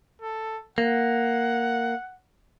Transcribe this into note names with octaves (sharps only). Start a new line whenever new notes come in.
A4
A#3 F#5